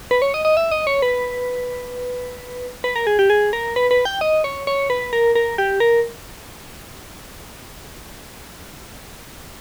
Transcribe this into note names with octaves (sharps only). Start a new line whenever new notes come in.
B4
C#5
D#5
D#5
E5
D#5
C#5
B4
B4
A#4
G#4
G4
G#4
A#4
B4
B4
G5
D#5
C#5
C#5
B4
A#4
A#4
G4
A#4